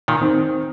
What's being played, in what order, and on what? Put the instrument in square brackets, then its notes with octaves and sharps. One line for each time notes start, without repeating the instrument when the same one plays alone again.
[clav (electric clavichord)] A#2 D#3
[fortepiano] D#3 C4